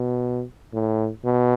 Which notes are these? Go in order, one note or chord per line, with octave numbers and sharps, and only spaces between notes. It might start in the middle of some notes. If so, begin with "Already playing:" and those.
Already playing: B2
A2
B2